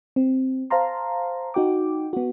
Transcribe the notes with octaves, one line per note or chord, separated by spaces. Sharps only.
C4
C5 F5 A5 A#5 C6
D#4 F#4 G5 D6
B3 F#4